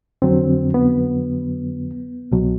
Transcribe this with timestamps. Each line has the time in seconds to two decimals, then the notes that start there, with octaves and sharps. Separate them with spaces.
0.22 F2 D3 F#3 C4
0.74 B3
2.32 C2 B2 F#3